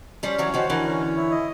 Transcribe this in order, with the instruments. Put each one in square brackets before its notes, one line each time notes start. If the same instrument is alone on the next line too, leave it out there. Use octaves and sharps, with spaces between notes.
[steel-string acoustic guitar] F3 G3 [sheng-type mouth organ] C#4
[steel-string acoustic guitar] E3 F#3 [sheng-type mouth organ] C#5
[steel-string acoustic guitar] D#3 F3 [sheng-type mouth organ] F#4
[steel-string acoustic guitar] D3 E3 [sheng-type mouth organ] A#4
[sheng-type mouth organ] C#4
C#5
E4
D#5